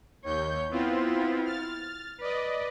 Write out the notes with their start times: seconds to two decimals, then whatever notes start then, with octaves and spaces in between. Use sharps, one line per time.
0.24 D#2 C#5 G6
0.71 B3 C4 E4 F4
1.45 F6 A6
2.21 B4 D5 D#5